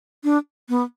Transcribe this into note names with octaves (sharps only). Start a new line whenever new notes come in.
D4
B3